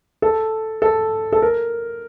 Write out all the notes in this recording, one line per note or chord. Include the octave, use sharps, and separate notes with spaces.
A4
A4
A4
A#4